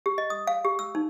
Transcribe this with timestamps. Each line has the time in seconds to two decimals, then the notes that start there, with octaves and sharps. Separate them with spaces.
0.06 G4
0.18 D#5
0.30 D#6
0.47 F5
0.65 G4
0.79 E6
0.95 D#4